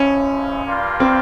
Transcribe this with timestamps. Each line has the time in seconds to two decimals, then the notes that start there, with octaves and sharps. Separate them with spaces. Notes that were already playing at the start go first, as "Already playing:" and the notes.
Already playing: F2 C#3 F3 G#3 C#4 E4
0.65 G2 G3 A#3 F4
1.00 C4